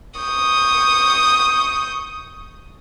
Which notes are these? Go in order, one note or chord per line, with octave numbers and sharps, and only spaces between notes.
C#6 D#6 G6